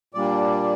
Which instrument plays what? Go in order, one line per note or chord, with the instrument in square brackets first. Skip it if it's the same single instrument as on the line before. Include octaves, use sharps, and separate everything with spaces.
[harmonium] A#2 G3 A#3 D4 D5